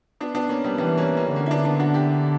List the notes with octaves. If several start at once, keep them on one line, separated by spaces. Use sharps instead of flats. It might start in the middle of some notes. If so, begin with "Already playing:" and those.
B3 D4
B3 D4
A#3 C#4
G3 B3
E3 G3 B3
A#3 C#4
A#3 C#4
D3 A#3 C#4
E4
B3 D4
B3 D4
D4 F#4
E4 G4